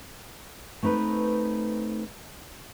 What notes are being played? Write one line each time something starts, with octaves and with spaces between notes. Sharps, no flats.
A3 C4 D#4 B4